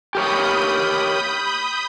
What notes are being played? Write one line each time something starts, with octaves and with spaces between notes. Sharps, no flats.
G4 A#4 C#5 B5 D#6 G6